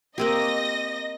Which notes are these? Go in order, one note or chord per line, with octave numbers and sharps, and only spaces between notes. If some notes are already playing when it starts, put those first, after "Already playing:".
A#3 C4 G4 D#5 A#6